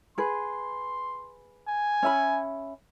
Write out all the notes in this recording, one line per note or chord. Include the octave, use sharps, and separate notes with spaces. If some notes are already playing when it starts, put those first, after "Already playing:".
G#4 B4 C6
G#5
C#4 E5 B5